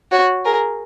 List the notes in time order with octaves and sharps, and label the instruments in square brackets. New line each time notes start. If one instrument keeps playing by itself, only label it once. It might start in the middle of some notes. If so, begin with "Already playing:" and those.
[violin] F#4 [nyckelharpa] C#5
[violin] G#4 [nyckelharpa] A#4